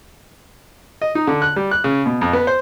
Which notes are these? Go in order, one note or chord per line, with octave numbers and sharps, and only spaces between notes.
D#5
D#4
D3
F#6
G3
F#6
C#3
B2
F2
B3
C5